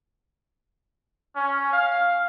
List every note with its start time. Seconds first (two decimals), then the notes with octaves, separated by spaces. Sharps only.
1.36 C#4
1.73 F5